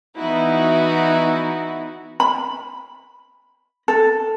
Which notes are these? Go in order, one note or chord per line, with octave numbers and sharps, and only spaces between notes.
E3 B3 D#4 E4 F#4
B5
A4